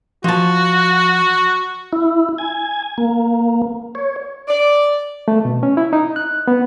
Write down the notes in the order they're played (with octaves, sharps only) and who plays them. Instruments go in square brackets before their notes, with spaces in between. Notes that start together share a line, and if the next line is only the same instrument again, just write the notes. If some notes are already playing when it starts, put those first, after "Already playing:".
[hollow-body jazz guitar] F3 A5 [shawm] F#4
[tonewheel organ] E4
G#5
A#3
C#5
[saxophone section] D5
[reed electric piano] A3
B2
C#4
E4
D#4
F#6
B3